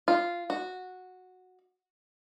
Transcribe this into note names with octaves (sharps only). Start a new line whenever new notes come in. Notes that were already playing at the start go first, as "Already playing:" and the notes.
F4
F#4